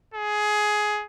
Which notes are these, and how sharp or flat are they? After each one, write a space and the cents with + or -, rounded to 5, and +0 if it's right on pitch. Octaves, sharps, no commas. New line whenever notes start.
G#4 +15